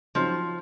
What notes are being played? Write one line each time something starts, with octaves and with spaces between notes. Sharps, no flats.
C#3 F3 F#3 C4 D#4